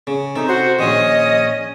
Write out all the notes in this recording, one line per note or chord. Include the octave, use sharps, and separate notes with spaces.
C#3
C3 D#4 A4
F#4 C5
A#1 A#2 D#3 C#4 D#5